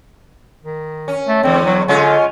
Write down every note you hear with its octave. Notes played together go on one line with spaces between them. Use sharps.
D#3
C#4
A3
E2 D3 C4
F#3
D3 G#3 C#4 F4